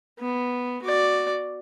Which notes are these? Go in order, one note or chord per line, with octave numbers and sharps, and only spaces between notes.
B3
F#4 D5